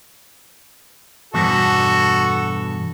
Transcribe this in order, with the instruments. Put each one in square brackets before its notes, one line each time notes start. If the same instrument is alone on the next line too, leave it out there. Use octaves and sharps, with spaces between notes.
[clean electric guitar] E2 G2 B2 [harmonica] F#4 A4